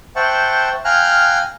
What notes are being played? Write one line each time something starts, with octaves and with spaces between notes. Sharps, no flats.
C5 E5 F#5 G5 A5 C#6
F5 G5 G#5 A#5 F6 F#6